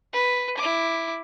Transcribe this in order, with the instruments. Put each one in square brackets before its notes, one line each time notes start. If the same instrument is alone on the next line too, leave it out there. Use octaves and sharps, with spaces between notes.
[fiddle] B4
E4 D6